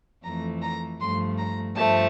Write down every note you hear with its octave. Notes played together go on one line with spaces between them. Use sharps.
F2 E3 A3 A#5
A#5
G2 F3 A3 C6
A#5
G2 F3 A3 A5